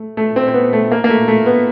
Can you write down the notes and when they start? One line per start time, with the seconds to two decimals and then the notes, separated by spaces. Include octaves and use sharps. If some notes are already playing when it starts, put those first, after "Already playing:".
Already playing: A3
0.17 A3
0.36 C4
0.48 C4
0.54 B3
0.73 A3
0.92 A#3
1.04 A#3
1.09 A3
1.28 A3
1.46 B3